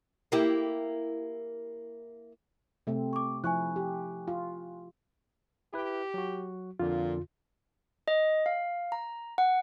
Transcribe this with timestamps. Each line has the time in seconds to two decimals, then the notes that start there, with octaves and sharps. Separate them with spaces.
0.32 A#3 E4 G4
2.87 C3 A3 C4
3.13 C#6 D6
3.44 F3 E4 G#5 C#6 F#6
3.76 G4
4.28 F4
5.74 E4 G4 B4
6.14 F#3 F#4
6.79 F2 A#2 D3 F4
8.08 D#5
8.46 F5
8.92 A#5
9.38 F#5